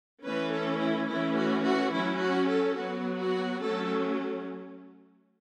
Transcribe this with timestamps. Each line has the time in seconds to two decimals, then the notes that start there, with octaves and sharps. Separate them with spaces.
0.24 E3 A3 C#4 B4
0.52 A4
0.80 E4
1.09 E3 A3 C#4 E4
1.36 F#4
1.65 F#4
1.92 F#3 C#4 E4
2.21 F#4
2.49 A4
2.76 F#3 B3 F#4
3.19 F#4
3.61 F#3 A3 C#4 A4